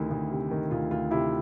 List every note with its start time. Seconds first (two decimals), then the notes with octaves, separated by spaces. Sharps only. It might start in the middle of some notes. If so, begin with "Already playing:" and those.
Already playing: D2 C3 D#3 E4
0.11 D2
0.31 C3
0.51 D#3
0.71 D2 F4
0.91 D2 F4
1.11 C3 E4